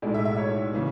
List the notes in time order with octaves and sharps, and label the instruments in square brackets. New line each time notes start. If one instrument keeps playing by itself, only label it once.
[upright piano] B1 A2 G#3 D5
E5
E5
C#5
C#3 E3